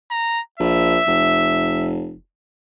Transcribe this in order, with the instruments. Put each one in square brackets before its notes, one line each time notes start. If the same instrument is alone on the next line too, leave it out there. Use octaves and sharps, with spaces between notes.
[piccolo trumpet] A#5
[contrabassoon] A#1 [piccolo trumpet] E5
[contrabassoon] F1